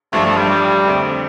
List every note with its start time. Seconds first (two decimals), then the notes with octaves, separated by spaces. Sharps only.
0.13 A1 G2 F3 A3 D4
0.25 A3
0.37 G3
0.50 G3
0.85 F2 D3 A3 C4